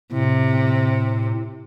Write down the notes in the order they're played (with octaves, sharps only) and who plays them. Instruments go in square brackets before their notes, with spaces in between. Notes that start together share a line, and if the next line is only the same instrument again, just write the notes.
[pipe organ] A2 [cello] C3